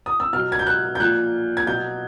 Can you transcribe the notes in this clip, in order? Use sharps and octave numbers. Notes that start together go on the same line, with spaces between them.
D#6
E6
B2 F#3 F6
G#6
G6
F#6
G6
A#2 F3 F#6
G#6
B2 F#3 G6